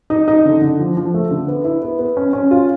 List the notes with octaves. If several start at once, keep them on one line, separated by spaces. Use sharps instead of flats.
D#4
D#4
D3
D3
F3
F3
A3
D3
B3
E4
B3
B3
C#4
C#4
F4